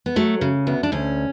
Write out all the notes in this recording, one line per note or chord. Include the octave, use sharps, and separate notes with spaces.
B3
F#3 A3
C#3
D2 B3
D4
D2 C#4